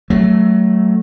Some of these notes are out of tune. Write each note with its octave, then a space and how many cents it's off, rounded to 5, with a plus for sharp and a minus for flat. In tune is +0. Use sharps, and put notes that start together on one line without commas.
F#3 +20 A3 +0